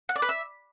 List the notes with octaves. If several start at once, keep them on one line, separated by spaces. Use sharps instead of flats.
F#5
D5
B4
E5